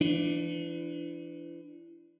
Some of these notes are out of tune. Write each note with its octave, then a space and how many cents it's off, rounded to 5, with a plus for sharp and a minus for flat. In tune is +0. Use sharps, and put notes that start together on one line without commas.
E3 +35 D4 +0